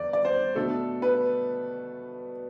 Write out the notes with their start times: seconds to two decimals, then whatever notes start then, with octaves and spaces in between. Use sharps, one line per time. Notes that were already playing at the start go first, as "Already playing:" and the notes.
Already playing: E2 D5
0.13 D5
0.25 C5
0.55 B2 A3 D4 A4
1.02 B4